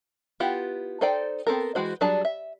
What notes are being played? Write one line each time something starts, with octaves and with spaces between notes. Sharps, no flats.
B3 E4 F4 G4 F#5
D#4 A4 C5 D5 G5
B3 C4 A4 A#4
E3 G#3 F#4 C5
F#3 G3 D4 G#4 A5
E5